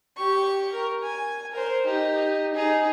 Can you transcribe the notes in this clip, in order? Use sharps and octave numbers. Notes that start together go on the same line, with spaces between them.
G4 C#6
A#4
G#5
A#4 C5
D#4 G4
D#4 G#4